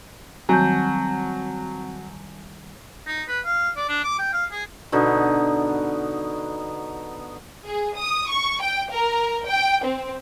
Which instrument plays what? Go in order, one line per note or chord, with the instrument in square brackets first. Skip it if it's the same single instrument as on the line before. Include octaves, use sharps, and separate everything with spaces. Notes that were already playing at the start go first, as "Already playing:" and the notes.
[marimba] D#3 G3 [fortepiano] F#3 [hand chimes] C4 F#5 [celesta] G#5 A5 G6
[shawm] D#4
B4
F5
D5
D4
D6
G5
F5
G#4
[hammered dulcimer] B2 D3 B3 D#4
[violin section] G#4
D#6
C#6
G5
A#4
G5
C4